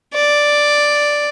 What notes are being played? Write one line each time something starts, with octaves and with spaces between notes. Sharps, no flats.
D5